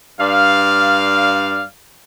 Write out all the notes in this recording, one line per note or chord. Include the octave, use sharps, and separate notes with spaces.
G2 D5 F5